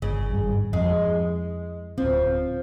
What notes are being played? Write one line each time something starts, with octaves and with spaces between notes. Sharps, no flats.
G1 C#3
G#1 G2
F2 G#3
D1 F3 C4